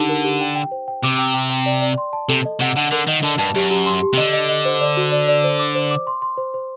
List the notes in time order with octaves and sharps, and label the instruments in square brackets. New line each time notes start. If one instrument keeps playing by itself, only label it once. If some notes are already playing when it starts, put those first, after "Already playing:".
Already playing: [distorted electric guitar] D3 [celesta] D#4 G4
[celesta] A#4
G4
G5
G5
C5
G5
[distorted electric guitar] C3 [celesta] D6
[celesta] G5
G5
G5
D5
D5
C6
A5
[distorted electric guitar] C3 [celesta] A4
[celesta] D#5
[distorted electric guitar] C3 [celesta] F#5
[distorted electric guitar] D3 [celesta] F#5
[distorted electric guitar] D3 [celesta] A#4
[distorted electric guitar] D#3 [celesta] D#5
[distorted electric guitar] D3 [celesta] A5
[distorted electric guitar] G2 [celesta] A5
[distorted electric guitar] F#2 [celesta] G4
[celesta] G4
C6
G4
[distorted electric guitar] C3
[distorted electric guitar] D3 [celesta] D#5
[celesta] D#5
D#5
C5
D5
F#4
D5
D5
C5
D6
C5
D6
C6
C6
C5
C5